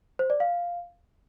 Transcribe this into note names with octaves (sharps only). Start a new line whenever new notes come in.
C5
D5
F5